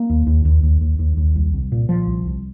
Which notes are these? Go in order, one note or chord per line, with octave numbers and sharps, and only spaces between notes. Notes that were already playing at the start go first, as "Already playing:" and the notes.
Already playing: A#3
D#2
D#2
D#2
D#2
D#2
D#2
D#2
C2
C2
A#2
A#2 F3
C2
C2